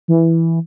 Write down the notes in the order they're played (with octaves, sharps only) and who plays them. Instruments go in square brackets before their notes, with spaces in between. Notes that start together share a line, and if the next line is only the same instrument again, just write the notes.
[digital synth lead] E3